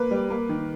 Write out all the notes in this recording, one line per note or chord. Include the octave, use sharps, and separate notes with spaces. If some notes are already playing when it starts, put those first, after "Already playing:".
Already playing: A#3 B4
G3
A#3
D#3